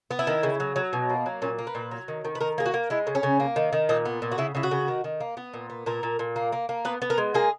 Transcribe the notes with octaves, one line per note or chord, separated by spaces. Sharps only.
B3
E4
D#3
C#3
F#3
F#3
B2
A#3
F#3
A#2 C#4
A#3
B4
A#2
F#3
D#3
D#3
B4
D#3 A#4
A#3 G#4
F#4
A#3
G#3 E4
C#3
C#4
C#3
A#3
D#3
D#3
A#2 D#4
B3
A#2
F#4
C#3 E4
C#3 E4
F#4
C#3
D#3
D#3
A#3
B3
A#2
B3
A#2 A#4
A#2
A#2
A#3
A#3
A#3
B3 B4
B3
A#4
G#3
A#3 G#4